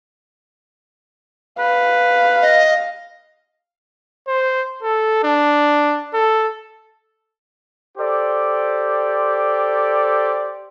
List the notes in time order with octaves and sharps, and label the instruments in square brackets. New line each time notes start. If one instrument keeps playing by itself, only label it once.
[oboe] B4 [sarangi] F5
[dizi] D#5
[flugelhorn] C5
A4
D4
A4
[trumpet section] G4 A4 C5 D5